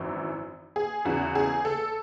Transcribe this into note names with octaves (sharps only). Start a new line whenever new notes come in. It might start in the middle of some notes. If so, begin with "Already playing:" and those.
Already playing: G#1 F#2 E3
G#4
E2 C#3 E3 F#4
G#4
A4